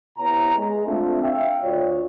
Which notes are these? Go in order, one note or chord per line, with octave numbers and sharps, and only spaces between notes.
C3 B3 E4 C#5 A#5
G#3
A3 C4 D4 F4
E5 F5 G5
D2 F4 C#5 D5